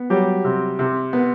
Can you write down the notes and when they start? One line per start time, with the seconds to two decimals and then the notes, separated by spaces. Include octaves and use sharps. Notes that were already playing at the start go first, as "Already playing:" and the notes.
Already playing: B3
0.10 F#3 G3 G4
0.45 C3
0.79 C3
1.13 B3